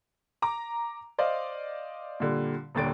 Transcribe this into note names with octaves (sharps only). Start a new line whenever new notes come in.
A#5 D6
C5 D5 D#5 F5
A#2 D3 G3
D#1 D#2 D3 A6 D7